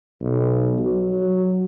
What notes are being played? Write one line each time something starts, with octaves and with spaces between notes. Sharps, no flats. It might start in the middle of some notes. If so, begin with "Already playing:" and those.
B1
F#3